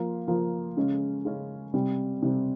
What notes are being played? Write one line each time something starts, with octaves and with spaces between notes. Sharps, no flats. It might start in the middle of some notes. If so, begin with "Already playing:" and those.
Already playing: F3 A#3 F4
F3 A#3 F4
C#3 G#3 C#4
C#3 G#3 C#4
C3 G3 C4
C3 G3 C4